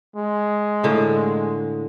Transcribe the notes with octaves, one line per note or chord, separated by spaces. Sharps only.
G#3
A2 D3 A#3